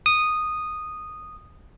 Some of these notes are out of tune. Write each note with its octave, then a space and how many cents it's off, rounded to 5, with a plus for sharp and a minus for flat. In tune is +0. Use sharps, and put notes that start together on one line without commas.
D#6 -10